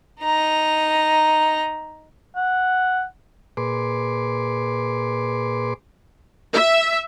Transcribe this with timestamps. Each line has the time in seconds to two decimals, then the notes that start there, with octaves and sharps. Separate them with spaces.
0.22 D#4 A#5
2.35 F#5
3.57 A#2 G#4 B4 C6 D6
6.53 E5